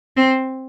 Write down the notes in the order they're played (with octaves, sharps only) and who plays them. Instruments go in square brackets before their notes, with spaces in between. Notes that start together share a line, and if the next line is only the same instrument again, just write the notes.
[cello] C4